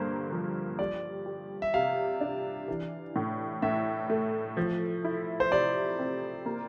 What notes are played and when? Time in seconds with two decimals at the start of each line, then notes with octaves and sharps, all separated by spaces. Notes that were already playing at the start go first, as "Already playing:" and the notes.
Already playing: G2 D3 A#3 C5
0.32 F3
0.79 G3 D5
1.26 G4
1.62 E5
1.74 C3 F5
2.21 D4
2.68 E3
3.16 A2
3.62 A2 E5
4.10 A3
4.57 F3
5.04 E4
5.40 C5
5.51 C3 D5
5.99 C4
6.46 A#3